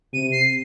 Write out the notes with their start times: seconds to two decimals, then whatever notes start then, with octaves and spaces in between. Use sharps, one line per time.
0.13 C3 D#7
0.32 C7